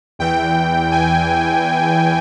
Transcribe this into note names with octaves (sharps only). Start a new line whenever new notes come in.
E2 E3 G5
G#5